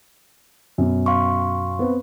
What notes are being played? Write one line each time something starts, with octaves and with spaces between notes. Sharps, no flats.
F#2 B2
F5 C6 C#6
B3 C4